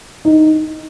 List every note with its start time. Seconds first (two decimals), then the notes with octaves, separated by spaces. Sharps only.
0.25 D#4